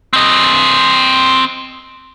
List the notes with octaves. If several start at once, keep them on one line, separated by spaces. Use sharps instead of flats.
C4 D#5